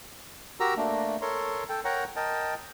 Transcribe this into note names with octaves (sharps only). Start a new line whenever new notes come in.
F#4 G4 A#4 A#5 E6
A3 A#3 D4
A4 A#4 C#5 C6
A4 G5
A#4 C#5 F#5 G5 A#5
A#4 D#5 G5 A5